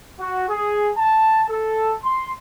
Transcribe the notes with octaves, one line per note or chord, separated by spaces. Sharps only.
F#4
G#4
A5
A4
C6